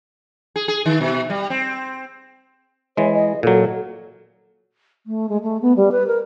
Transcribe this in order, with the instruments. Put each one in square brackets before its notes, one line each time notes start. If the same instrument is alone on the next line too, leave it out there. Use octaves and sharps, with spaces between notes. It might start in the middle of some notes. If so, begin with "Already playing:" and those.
[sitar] G#4
G#4
D#3
B2
G3
C4
[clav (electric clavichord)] E3 G#3 [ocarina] C#5
[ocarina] D#5
[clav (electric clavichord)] A#2 F#3 [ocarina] A4
[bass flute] A3
G#3
A3
B3
G3
B4
A#4